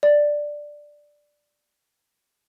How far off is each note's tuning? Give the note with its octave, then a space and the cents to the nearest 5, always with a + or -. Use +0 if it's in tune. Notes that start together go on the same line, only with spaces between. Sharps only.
D5 +5